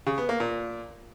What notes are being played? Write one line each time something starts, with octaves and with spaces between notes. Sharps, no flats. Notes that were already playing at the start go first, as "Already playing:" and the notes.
C#3
B3
A#3
A#2